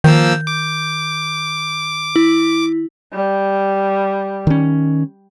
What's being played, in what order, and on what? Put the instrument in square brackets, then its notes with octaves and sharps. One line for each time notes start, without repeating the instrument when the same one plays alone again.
[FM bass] D#3 [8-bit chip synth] F3 A#3 E6 [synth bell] G6
[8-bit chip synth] D6
[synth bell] E4
[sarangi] G3
[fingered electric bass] D#3 C#4